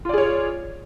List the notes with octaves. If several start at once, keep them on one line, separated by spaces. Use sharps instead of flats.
F4 G#4 C#5 D5